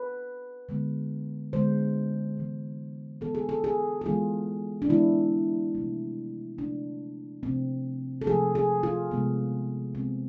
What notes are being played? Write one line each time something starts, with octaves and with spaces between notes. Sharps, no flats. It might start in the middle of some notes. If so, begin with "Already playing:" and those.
Already playing: B4
D3 G#3 B3
D3 G#3 B3 C5
E3 G#3 B3
E3 G#3 B3 A4
G#4
A4
G#4
G#4
E3 G#3 B3 F4
D4
E3 G#3 B3 E4
C3 F3 A3
C3 F3 A3 D4
C3 F3 A3 C4
A4
C3 F3 A3 G#4
G#4
F4
C3 G#3 B3
C3 G#3 B3 C4